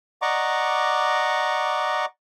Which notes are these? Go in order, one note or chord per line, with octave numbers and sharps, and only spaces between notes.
D5 D#5 F#5 A#5 C#6 D6